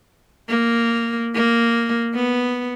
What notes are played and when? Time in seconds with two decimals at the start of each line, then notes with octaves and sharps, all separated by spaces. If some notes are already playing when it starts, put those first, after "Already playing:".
0.49 A#3
1.34 A#3
2.14 B3